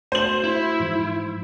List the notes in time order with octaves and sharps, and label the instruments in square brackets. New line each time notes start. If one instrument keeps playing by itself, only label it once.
[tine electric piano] A3 F#4 [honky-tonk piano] C5 F#7
[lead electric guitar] E4
[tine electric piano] G#2 E3 F3